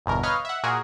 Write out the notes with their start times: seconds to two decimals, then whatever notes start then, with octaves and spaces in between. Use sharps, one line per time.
0.06 G1 E2 B2 A#4
0.23 B4 C#5 D#5 F5 F6
0.45 E5 F#5
0.63 A#2 F#4 G#4 A#4